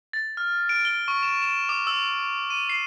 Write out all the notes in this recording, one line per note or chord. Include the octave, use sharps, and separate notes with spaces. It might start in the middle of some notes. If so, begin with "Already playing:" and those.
A6
F6
D7
G7
C#6
E7
E7
D6
E6
D#7
C7